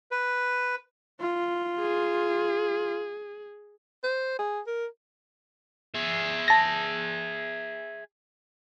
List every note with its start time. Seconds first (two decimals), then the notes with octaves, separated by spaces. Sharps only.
0.11 B4
1.21 F4
1.80 G#4
4.04 C5
4.39 G#4
4.67 A#4
5.95 G#4 E5
6.48 A5 A#6